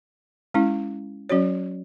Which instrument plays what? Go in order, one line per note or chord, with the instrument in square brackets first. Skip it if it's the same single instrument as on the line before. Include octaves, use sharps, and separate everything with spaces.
[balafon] G#3 C#4 E4
F#3 C#4 F#4 C#5